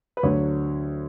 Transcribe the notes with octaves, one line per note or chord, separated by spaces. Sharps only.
B4
D2 D3 F#3 C#5